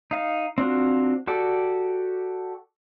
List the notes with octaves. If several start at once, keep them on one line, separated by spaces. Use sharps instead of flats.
D#4 F5
C4 D4 F4 F#4
F#4 G4 A4 D5